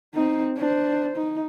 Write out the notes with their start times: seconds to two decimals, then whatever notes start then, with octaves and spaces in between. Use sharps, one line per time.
0.14 C4 D#4
0.57 D4 C5
1.17 D#4